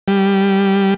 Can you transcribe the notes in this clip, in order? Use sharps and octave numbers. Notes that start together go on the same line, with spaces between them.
G3